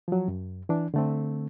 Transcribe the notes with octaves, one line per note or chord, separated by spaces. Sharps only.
F3 F#3
F#2
E3 D4
D3 A3 C4